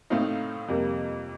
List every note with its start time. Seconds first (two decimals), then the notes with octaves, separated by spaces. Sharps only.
0.10 A2 A3 C4 D#4 F5
0.68 F2 C3 G3 A#3